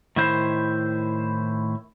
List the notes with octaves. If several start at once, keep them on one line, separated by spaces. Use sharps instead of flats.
A2 D#3 E4 C5